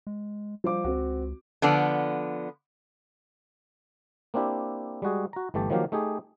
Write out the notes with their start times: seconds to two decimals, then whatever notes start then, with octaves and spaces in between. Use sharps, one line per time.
0.07 G#3
0.64 F3 G3 C5 D6
0.84 C#2 C4 F#4
1.62 D3 F3 B3 D5
4.34 A#3 C4 D4 E4 G4
5.02 G3 G#3 F#4 G#4
5.33 F#4 A#5
5.54 G1 E3 A3 G4 A5
5.70 D#3 F3 F#3 A#3 G4 F5
5.92 A3 D#4 G4 G#4